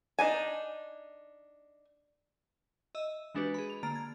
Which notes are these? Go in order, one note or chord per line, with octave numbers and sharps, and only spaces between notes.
D4 D#4 G#5
D#5 E5 E6
E3 G#3 D4 F#4 G4 B4
G#4 B5
F7
D3 A#3 A#5 A6 D7
G#6